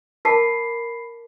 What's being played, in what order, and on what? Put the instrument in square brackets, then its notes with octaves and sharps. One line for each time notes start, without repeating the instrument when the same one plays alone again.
[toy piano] A#4 A5 D6 [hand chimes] B5 B6 C7